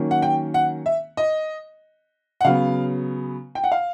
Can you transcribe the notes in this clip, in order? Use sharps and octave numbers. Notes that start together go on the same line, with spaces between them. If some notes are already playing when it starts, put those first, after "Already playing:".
Already playing: D#3 F#3 A#3 C#4
F#5
G5
F#5
E5
D#5
F#5
C#3 F#3 B3 F5
G5
F#5
F5